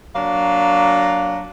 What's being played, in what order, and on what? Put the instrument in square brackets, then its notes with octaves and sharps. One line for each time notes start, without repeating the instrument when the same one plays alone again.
[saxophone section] F#3 A#3 D4 F5